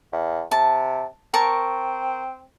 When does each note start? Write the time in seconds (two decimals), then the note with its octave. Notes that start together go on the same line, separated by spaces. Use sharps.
0.12 E2
0.51 C3 A5
1.34 C4 A#4 A5 C#6